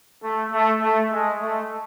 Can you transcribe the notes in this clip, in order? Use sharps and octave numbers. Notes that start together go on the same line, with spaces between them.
A3
A3
A3
G#3
A3